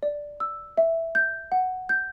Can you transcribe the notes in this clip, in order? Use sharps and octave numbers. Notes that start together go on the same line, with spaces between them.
D5
E6
E5
G6
F#5
G6